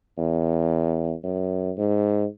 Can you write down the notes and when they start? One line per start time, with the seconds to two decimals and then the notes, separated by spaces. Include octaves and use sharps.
0.18 E2
1.24 F#2
1.78 G#2